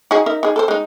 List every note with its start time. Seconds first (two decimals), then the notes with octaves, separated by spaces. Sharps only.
0.11 D#4 F#4 G#4
0.26 D#4 A#4 E5
0.43 D#4 G#4
0.56 A4 A#4 C5
0.68 G#3 D#4